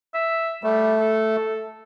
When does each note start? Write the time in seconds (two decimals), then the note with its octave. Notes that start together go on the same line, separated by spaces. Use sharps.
0.14 E5
0.64 G3 A3
0.99 A4